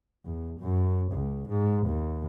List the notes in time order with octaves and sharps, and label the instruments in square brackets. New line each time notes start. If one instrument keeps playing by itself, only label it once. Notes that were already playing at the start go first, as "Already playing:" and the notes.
[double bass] E2
F#2
C#2
G#2
D#2